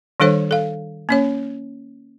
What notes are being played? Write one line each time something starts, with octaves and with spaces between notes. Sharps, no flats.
D#3 G3 D4 A4 C5 C#5
A4 F5
A#3 C#4 C#5